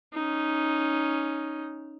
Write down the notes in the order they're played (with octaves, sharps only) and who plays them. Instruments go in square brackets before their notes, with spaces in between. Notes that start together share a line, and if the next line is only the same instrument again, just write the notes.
[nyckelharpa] C#4 D#4